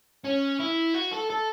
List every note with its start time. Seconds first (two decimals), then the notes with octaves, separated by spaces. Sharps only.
0.24 C#4
0.59 E4
0.94 F#4
1.12 A4
1.30 A4